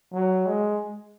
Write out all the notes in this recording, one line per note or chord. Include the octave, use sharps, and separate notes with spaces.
F#3
G#3